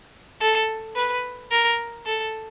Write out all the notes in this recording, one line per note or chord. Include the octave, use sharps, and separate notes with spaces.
A4
B4
A#4
A4